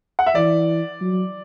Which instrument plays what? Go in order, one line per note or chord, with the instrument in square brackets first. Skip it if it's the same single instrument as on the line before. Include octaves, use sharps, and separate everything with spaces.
[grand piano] F#5
E5
[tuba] E3 [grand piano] D5
[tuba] F#3